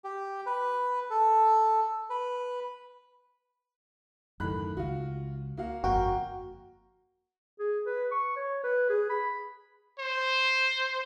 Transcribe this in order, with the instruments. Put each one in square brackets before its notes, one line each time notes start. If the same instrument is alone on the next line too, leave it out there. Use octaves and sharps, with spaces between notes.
[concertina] G4
B4
A4
B4
[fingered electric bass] F#2 D#3 [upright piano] A2 B5 F#6
[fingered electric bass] C#2 [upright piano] F4 F#4
[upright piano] A#3 F#4 F5
[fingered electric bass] G1 F2 [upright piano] A#3 A#4 G5 [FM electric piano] F#4
[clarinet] G#4
B4
C#6
C#5
B4
G#4
B5
[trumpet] C5